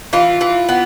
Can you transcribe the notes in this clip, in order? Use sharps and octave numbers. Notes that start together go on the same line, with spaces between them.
E3 F4
E3
B3